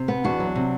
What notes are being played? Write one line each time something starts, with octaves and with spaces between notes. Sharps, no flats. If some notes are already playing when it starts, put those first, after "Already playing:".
Already playing: C3
B3
E2 D4 F#4
F#3
C3